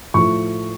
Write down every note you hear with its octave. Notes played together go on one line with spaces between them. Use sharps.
A2 F3 A3 C#6